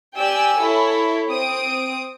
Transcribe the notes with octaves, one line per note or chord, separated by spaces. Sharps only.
G4 D5 G5 G#5 E6
E4 A4 C#5
C4 D#6 D7